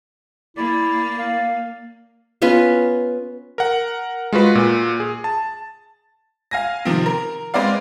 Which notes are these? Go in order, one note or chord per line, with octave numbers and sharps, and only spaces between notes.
A#3 E4 D5
F5
B3 C#4 F4 B4
A#4 F#5
G#3 F4 F#4 B4
A#2
G#4
A5
F5 G#5 A#6
C3 D#3 F3 C4
A#4
G#3 C4 B4 D5 F5